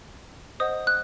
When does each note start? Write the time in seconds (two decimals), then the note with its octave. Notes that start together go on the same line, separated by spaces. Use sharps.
0.60 C5 D#5 F#5 D#6
0.87 F#6